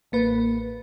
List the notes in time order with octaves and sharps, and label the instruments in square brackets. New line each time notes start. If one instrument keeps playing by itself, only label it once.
[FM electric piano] A1 A#3 B4